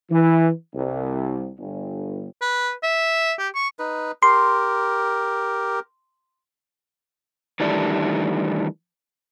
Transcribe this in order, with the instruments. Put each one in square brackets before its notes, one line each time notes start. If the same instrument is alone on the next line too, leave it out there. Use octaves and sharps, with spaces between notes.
[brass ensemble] E3
C2
G1
[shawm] B4
E5
G4
C#6
[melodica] D#4 B4
[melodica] G4 A#4 [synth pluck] C6
[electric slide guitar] D#3 E3 G3 A3 D4